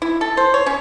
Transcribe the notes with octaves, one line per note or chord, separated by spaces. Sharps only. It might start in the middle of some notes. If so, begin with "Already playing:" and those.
E4
A4
C5
C#5
C#4